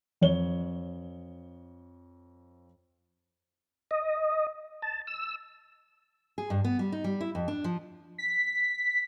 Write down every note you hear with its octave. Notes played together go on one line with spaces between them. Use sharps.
F2 C#5 G7
D#5
A5
E6
G#4
G2
B3
G3
D#4
G3
E4
F2
D4
F3
B6